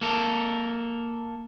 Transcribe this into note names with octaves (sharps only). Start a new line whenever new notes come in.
A#3 A4 A#4